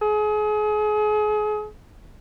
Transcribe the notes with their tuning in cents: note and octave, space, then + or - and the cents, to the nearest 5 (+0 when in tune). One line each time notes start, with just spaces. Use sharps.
G#4 +35